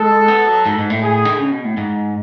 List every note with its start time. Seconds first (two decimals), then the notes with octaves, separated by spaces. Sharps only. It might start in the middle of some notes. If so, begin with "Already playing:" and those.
Already playing: G#3 A4
0.28 B3
0.47 F#3
0.66 G#2
0.78 G#2
0.90 A2
1.02 G#4
1.25 D3
1.39 C#3
1.51 B2
1.64 A2
1.77 G#2